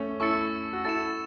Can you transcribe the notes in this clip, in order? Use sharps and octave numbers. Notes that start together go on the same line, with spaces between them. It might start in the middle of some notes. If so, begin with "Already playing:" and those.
Already playing: A3 C#4
E4 A4 C#6 E6 A6 C#7
F#4
E4 A4 A6 C#7 E7